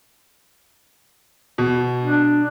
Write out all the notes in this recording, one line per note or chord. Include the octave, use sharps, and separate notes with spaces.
B2
D4